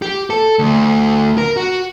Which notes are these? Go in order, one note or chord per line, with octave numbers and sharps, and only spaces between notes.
G4
A4
D2
A#4
F#4